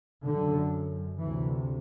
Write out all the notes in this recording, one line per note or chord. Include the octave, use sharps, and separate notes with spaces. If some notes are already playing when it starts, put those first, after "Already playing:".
F#2 D3
D2 C3 E3